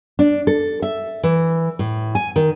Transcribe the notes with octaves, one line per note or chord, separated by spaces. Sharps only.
D4
A4
E5
E3
A2
G#5
D#3